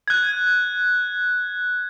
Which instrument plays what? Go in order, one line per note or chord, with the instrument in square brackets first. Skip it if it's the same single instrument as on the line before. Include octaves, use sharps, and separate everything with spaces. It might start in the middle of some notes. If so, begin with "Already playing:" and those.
[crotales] F#6 G#6